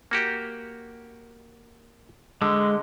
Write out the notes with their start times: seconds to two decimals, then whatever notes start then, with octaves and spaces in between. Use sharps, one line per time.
0.11 A#3 F#4 G4
2.42 D3 G#3